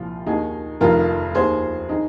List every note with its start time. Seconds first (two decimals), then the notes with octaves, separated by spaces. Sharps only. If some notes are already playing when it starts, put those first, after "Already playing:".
Already playing: C2 A#2 F3 F4
0.26 D#2 D#3 D#4 G#4
0.81 F1 F2 D#3 F4 A#4
1.35 D#2 D#3 G#4 C5
1.89 D#3 D#4 G#4